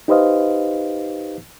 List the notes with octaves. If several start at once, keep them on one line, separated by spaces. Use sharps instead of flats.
D#4 G4 B4 C5 D#5 F5